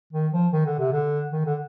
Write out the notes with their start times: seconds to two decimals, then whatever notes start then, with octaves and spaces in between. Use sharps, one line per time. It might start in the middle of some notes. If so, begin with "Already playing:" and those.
0.13 D#3
0.32 F3
0.53 D#3
0.66 D3
0.79 C3
0.92 D3
1.32 D#3
1.46 D3